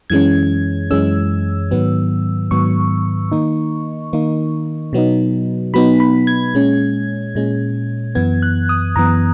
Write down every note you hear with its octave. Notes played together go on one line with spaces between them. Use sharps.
F#2 E3 G#3 C#4 G#6
F#2 E3 G#3 C#4 E6
G#2 D#3 F#3 B3
G#2 D#3 F#3 B3 C#6
D#3 A#3 D#4
D#3 A#3 D#4
B2 F#3 B3 D#4
B2 F#3 B3 D#4 B5
B5
G#6
A#2 G#3 C#4
A#2 G#3 C#4
F#2 E3 B3 G#6
F#6
D#6
F#2 E3 B3 A#5